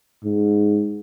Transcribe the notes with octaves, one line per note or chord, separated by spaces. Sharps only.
G#2